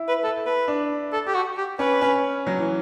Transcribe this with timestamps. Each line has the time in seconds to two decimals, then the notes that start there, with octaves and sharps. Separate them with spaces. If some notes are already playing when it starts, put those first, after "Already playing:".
Already playing: E4
0.08 B4
0.23 A4
0.46 B4
0.68 D4
1.13 A4
1.27 G4
1.34 F#4
1.57 G4
1.79 C#4 B4
2.01 C#4
2.47 F#3
2.59 E3